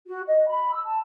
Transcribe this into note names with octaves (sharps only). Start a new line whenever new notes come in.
F#4
D#5
B5
E6
A5